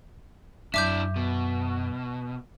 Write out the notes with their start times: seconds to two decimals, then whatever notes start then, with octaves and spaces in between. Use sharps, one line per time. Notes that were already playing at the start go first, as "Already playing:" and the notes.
0.74 F#2 D4 E4 E5 D6 G6
1.16 B2